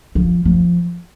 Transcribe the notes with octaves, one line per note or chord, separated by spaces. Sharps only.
F3
F3